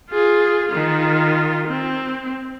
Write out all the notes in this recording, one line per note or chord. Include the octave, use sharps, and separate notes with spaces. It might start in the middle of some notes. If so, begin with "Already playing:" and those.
F4 G#4
D#3 F4
C4